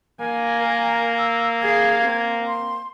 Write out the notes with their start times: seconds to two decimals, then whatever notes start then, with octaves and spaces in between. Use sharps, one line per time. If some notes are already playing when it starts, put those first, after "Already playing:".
0.21 A#3 G#5
0.59 A#4
1.17 E6
1.61 G#4 F5 G#6
2.03 C4
2.47 C6